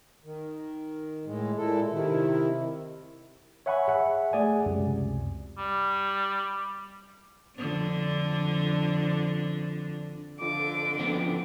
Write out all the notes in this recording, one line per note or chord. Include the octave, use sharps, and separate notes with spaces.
D#3
A2 G#3
A#2 G#3 E4 A4
C3 D#3 E4
C#5 E5 F#5 G#5 B5 C#6
G#4 E5 F#5 G#5
A3 G#4 D5 G#5
C#2 F#2 C3
G3
F2 D3 D4
F2 D3 D6
F#1 F3 B3 C4